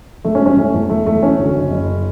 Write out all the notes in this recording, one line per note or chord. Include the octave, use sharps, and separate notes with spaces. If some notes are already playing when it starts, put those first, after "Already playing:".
E1 A3
C#4
G3
C#4
E2 A3
E2
E1 A3
E2 A3
E3 C#4
D2
F#1
F#1